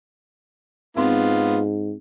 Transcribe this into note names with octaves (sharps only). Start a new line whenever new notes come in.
G#2 B3 C4 F4 C6